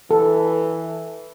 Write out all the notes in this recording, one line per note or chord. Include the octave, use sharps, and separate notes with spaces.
E3 A4